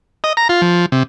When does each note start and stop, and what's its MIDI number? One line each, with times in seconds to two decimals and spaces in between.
0.24 0.33 75
0.37 0.48 82
0.49 0.61 65
0.62 0.86 53
0.92 1.03 48